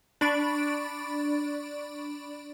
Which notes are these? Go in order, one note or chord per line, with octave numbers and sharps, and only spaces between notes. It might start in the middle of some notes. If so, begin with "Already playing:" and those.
D4 D5 B5 C#6 A6 D7